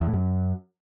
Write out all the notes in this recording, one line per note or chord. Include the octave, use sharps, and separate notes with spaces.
E2
A2
F#2